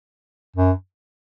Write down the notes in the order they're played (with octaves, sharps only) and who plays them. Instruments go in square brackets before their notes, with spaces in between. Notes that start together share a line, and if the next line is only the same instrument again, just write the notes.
[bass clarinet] F#2